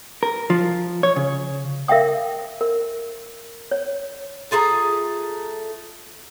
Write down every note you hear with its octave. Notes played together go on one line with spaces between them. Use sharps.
A#4
F3
C#5
C#3
A#4 E5 F5 G5 D#6
A#4
C#5
A3 F4 G#4 A#5